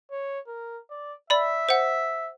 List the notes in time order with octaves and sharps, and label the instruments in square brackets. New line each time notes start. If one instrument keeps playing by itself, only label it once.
[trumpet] C#5
A#4
D5
[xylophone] D5 B5 [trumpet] E5
[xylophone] C5 F#5